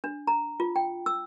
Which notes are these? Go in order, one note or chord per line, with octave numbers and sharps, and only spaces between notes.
D4
A#5
F4
G5
E6